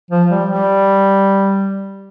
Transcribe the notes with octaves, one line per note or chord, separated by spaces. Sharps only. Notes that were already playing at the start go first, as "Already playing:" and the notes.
F3
G3
G3